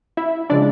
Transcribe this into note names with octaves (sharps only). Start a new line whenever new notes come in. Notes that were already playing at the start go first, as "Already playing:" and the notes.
E4 E5
C#3 F3 G#3 D4 D5